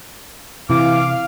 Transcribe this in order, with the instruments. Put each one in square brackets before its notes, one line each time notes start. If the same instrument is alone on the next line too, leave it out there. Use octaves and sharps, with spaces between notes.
[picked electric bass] C3 [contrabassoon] E3 [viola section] F5 [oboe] D6